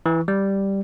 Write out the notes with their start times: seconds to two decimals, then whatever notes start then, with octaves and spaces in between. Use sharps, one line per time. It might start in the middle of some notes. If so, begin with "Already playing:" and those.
0.06 E3
0.28 G3